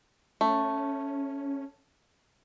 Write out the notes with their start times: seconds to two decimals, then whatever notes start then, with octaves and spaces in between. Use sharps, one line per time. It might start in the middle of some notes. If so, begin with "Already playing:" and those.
0.41 A3 C#4